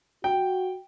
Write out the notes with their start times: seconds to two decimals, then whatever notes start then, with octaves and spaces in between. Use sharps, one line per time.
0.24 F#4 G5